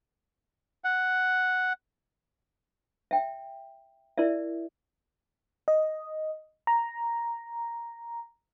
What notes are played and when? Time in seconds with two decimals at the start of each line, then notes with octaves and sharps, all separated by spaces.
0.84 F#5
3.11 E5 G5
4.18 E4 A#4 D5 E5
5.68 D#5
6.67 A#5